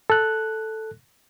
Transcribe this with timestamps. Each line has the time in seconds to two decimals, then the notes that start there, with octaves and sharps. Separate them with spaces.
0.10 A4 F#6